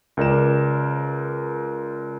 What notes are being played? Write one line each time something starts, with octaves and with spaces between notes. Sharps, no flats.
C#2 A#4 D5 E7